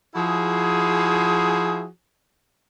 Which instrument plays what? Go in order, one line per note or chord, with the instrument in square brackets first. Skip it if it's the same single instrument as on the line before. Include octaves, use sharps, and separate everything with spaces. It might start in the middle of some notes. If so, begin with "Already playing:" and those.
[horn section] F3 E4 F#4 G#4